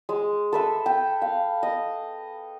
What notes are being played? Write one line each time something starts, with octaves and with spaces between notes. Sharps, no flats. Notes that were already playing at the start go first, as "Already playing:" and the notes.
G#3
A4 B4 E5
G5
F5
D#5